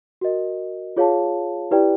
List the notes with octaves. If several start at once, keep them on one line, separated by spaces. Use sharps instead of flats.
F#4 A#4 D#5
F4 G#4 C#5 F5 A5
E4 G4 B4 D5 G5